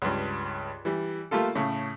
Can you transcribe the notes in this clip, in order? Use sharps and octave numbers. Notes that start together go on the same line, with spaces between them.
C#2 G2
E3 G3
G3 A3 A#3 F4 A4
A2 C#3